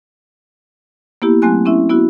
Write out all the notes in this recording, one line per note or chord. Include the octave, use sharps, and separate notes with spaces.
A#3 B3 E4 G4
F#3 A3 C4 G#5 F#6
C4 C#4 E4 E5
B3 E4 F#4